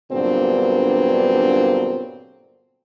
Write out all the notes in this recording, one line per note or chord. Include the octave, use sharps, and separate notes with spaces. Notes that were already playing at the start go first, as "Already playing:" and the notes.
G2 A#2 D3 F#3 B3 C4